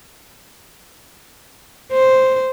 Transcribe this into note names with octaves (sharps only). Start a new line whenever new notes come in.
C5